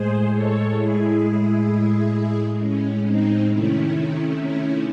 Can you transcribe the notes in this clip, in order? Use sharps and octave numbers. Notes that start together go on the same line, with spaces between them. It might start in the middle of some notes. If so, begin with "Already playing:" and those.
Already playing: A2 G#3 G#4 C5
A4 C#5
E4 G#4
C#4
C4 D#4
C3 D#3 A3 C#4 E4
C#4 E4